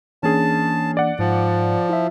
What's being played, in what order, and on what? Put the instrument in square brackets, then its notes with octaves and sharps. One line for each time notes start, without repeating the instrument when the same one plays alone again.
[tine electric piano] E3 A#3 D4 [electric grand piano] C#4 G#4 [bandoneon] A5
[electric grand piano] D5 F#5
[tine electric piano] G#2 [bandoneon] F3
[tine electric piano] E4 F4 E5